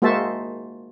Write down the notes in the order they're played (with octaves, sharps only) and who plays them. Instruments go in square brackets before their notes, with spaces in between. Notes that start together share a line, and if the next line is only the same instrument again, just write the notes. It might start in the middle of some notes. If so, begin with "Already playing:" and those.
[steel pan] G#3 A#3 F#4 C5 E5 A5